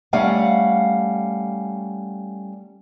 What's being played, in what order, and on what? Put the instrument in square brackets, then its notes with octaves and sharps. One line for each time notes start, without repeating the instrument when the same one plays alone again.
[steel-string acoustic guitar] G3 A3 C#4 F5 F#5